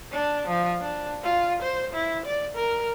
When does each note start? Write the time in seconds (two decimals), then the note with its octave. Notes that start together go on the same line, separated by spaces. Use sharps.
0.12 D4
0.48 F3
0.81 D4
1.24 F4
1.62 C5
1.93 E4
2.26 D5
2.55 A#4